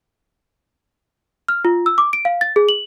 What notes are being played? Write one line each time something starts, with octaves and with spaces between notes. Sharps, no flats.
F6
F4
E6
D6
D7
F5
A6
G#4
F#7